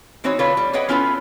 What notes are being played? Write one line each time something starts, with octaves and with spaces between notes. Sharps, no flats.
E3 C4 D#4 F#4 C#5
D3 F4 A4 B4 C#5
G3
G#4 B4 C#5 D#5 F#5 G5
B3 C#4 E4 F4 A4 B4